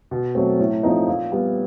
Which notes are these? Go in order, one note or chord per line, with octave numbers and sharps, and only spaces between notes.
B2
F#3 A3 C4
A2
F3 A3 C4 D#4
A#2
G3 B3